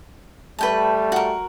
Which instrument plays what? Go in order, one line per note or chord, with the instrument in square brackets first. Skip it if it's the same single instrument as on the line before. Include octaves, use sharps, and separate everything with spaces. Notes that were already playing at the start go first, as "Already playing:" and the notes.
[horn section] G3 A3 [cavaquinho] B4 G5 A5
[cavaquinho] F#4 A#4